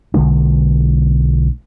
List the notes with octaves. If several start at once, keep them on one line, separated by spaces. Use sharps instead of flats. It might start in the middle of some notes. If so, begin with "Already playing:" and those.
B1 D3 G#3 D4